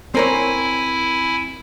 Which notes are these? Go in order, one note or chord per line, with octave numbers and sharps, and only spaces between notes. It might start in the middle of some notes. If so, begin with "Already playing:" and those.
C4 E4 A#4 C#5 G#5